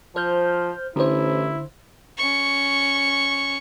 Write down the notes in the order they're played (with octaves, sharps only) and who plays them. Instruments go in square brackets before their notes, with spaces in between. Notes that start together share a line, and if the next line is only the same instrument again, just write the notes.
[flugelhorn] F3 [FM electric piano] C5 F6 G6
[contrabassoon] A1 [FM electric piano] D3 C5 [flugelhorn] E4
[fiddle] C#4 C#6